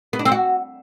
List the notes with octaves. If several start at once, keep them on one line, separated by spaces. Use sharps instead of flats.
B3
D4
C4
F#4